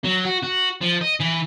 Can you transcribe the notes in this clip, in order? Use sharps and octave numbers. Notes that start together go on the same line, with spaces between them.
F#3
F#4
F#4
F3
D#5
E3